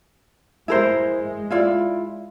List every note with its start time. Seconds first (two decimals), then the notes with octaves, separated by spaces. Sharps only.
0.68 G#3 E4 A#4 C5
1.51 E4 F4 D5